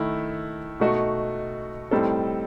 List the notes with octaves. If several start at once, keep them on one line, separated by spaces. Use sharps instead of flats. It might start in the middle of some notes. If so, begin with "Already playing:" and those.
Already playing: D#3 A3 E4
B2 A3 D#4 F#4
A2 G3 C4 D#4 A4